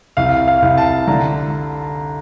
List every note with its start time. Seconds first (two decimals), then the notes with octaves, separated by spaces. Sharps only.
0.17 C2 F5
0.48 F5
0.62 C2
0.78 A5
1.07 D3 A#5